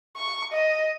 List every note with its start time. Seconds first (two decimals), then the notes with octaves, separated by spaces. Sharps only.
0.17 C#6
0.53 D#5